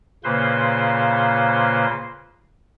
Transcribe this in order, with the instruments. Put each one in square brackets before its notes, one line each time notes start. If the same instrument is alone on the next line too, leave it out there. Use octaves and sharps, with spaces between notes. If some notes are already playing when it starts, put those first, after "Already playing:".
[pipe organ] A#2 C#3 A#3 B4 C5 C6